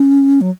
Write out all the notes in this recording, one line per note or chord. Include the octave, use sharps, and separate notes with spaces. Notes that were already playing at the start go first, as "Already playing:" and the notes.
Already playing: C#4
F#3